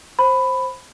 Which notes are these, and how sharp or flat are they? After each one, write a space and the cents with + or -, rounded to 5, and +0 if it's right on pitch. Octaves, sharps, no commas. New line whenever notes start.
C5 +15 B5 +10